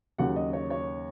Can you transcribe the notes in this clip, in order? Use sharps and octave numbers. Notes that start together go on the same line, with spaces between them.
D#2 C#3 F#3 F#5
D#5
C#5
C#5